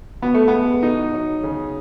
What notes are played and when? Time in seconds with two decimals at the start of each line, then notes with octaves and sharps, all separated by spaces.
0.22 B2 B3
0.34 A3
0.48 G#3 B3
0.83 B2 D#4
1.14 F#3
1.43 C#3